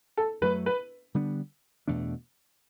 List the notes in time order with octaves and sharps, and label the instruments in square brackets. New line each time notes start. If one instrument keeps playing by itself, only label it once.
[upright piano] A4
[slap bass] F#2 F#3 A3 [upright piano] B4
[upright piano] B4
[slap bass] D3 G3 B3 D4
E2 B2 A3 D4